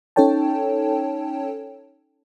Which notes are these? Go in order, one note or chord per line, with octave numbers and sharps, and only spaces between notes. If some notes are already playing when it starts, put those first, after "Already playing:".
C#4 D#4 A4 C#5 G5 A5